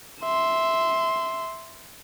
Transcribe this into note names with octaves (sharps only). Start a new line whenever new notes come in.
E5 C6